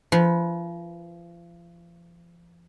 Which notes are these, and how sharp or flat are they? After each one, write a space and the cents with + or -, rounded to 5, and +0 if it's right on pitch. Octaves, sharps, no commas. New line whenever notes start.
F3 -35 B4 -15